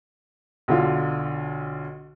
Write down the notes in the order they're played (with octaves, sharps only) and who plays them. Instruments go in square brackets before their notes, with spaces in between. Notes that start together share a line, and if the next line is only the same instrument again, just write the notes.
[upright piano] B1 D3 F4